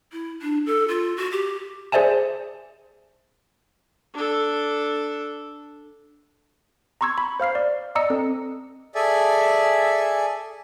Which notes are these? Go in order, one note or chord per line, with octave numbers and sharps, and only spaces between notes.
E4
D4
A4
F4
F#4
G4
G#4 C5 D5 E5 G#5 A5
D4 A4
A#5 C6 C#6 E6 G#6
B5
C5 F5 F6 C7
D5
D5 D#5 A#5 D#6 E6 C#7
C4 A4
G#4 A4 D5 E5 G#5